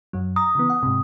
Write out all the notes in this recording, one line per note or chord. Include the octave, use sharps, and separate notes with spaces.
F#2 F#3
A#5 D#6
C#3 E3 B3
F#5
G#2 C3